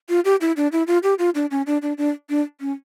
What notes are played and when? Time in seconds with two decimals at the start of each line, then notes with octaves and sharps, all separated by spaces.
0.09 F4
0.25 G4
0.41 E4
0.57 D4
0.72 E4
0.87 F4
1.03 G4
1.19 F4
1.35 D4
1.51 C#4
1.67 D4
1.82 D4
1.98 D4
2.30 D4
2.61 C#4